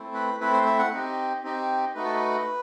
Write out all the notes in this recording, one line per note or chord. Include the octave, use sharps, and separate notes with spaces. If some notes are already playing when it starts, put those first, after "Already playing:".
Already playing: A3 C4 E4
B4
A3 C4 E4 B4
C5
E5
F#5
C4 D#4 G4
C4 D#4 G4
A3 D#4 F#4 B4
A4
B4